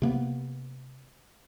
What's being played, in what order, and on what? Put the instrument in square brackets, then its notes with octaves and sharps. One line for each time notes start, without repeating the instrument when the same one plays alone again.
[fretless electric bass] C3 A#3 B3